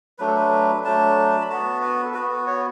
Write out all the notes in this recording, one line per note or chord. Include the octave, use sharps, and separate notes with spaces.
F#3 A3 D4 B4
A4
B4
F#3 A3 D4 A5
B5
B3 F#4 A5
B4
A4
F#4 B4
B3
B4
C#5